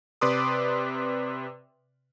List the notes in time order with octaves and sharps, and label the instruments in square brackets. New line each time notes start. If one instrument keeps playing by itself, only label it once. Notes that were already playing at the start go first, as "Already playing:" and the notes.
[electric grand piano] C3 B4 D5 C6 D6 D#6